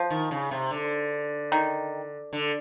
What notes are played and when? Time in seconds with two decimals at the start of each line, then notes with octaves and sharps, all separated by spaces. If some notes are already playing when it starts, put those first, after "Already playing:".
Already playing: F3
0.10 D#3
0.31 C#3
0.51 C3
0.71 D3
1.52 D#3
2.33 D3